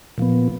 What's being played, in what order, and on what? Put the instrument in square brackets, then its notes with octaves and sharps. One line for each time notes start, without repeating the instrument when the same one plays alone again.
[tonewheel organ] A#2 F3 B3